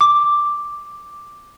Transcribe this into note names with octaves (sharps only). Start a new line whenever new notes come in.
D6